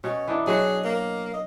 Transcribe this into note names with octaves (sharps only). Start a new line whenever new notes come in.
B2 C#4
E3 D4 D#4
F#3 F#4 G#4
A#3
D#5